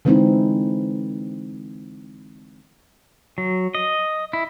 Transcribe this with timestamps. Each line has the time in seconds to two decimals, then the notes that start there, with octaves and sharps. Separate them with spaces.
0.05 D3 E3 G#3 C4 D#4 E4
3.38 F#3
3.75 D#5
4.33 E4